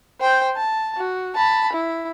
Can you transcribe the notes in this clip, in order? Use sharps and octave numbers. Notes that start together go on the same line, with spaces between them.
C5 G5
A5
F#4
A5 B5
E4